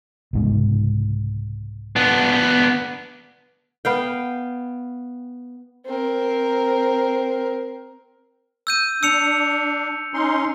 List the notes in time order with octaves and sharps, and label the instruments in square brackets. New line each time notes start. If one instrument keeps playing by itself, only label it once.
[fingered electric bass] C2 G#2 C#3
[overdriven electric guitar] B3 D4
[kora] B3 F5 G5
[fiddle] C4 A#4
[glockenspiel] E6 G6 D#7
[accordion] D4 [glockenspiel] E6 C#7 F7
[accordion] C#4 D#4 C6